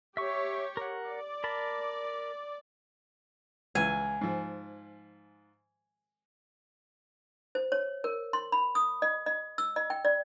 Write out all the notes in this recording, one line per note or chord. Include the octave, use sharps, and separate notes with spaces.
G4 C#5 E5 C#6
A#4 F#5
D5
A#4 A5 B5
C#2 E3 G#5
G#2 F3
C5
C#5
A#4
C6
B5
D#6
D#5
D#5
E6
D#5
G5
D5